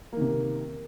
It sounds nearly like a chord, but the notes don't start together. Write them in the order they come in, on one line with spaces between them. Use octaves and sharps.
A#3 D#3 C3